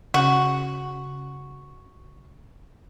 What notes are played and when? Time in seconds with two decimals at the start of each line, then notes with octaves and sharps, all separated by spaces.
0.14 C#3 F#4